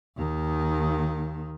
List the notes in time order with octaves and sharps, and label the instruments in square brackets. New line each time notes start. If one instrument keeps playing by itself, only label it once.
[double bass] D#2 D#3